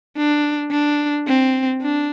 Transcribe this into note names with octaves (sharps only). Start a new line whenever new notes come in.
D4
D4
C4
D4